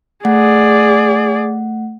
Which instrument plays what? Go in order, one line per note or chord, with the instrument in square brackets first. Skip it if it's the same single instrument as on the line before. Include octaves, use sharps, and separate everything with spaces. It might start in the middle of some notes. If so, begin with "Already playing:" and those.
[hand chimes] A3 F#5 [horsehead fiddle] G#4 D5